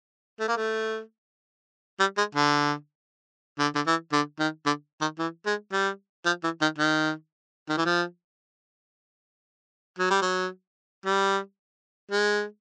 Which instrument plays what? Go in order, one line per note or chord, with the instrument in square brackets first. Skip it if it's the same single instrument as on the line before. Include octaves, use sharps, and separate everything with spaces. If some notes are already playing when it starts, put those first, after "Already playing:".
[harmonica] A3
A#3
A3
G3
G#3
D3
D3
D3
E3
D3
D#3
D3
D#3
E3
G#3
G3
F3
E3
D#3
D#3
D#3
E3
F3
F#3
G3
F#3
G3
G#3